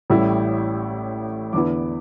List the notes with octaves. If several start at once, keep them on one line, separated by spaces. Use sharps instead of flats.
A1 A2 G3 E4
E2 D3 B3 E4 D6